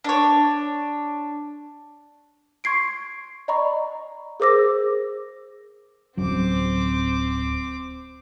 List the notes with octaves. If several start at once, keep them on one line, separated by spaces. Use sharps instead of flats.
D4 C#5
C6 C#6 G#6 C7 D7
D5 D#5 A#5 B5 C#6
G#4 A#4 C5 D6 E6 A#6
D1 F#3 C4 C#4 D6